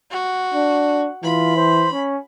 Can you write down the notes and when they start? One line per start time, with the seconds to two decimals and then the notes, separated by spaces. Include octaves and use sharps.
0.11 F#4
0.54 D4
1.24 E3 F4 B5
1.56 C5
1.92 C#4